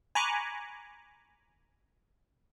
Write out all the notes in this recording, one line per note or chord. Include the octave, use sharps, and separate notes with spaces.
G#5 A#5 B5 C#6 D6 F#6